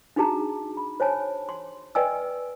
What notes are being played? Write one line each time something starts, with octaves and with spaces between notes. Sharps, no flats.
D4 D#4 F#4 G#4 A5 A#5
B5
C5 C#5 G#5 A5
C6
B4 D5 D#5 G5 G#5 E6